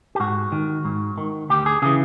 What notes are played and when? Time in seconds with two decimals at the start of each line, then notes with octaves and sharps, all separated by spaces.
0.15 G4
0.20 G#2 F#4
0.52 D#3
0.85 G#2
1.18 D#3
1.49 D2 G4
1.66 G#4
1.82 C#3 E3 G#4